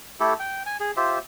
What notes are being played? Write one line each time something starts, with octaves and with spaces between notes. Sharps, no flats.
A3 E4 G4 A4
G5
G#5
G#4
F4 G4 C5 E5